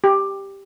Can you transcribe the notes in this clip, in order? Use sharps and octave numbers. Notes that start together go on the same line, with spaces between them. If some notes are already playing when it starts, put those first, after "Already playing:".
G4